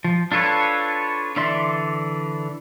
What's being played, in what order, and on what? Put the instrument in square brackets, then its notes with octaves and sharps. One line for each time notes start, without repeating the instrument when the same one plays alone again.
[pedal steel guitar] F3
D4 F4 A4 B4 C#5
D3 E3 D5 E5 C6